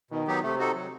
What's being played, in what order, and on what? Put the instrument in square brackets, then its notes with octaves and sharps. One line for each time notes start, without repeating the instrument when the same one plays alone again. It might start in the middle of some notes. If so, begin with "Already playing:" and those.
[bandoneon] B2 [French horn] D#3
[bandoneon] F#3 B3 D#4 G4
[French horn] C3 [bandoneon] A3
[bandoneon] D#4 F#4 A4
F#3